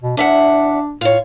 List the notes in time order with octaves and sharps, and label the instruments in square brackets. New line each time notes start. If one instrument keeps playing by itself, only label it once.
[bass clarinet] B2
[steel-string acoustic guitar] E2 E5 F#5 [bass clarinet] D4
[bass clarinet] A2 [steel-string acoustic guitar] F4 C#5